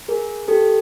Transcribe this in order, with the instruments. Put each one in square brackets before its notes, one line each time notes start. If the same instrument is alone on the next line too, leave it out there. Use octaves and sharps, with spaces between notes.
[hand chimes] G#4 A#4
G4 A4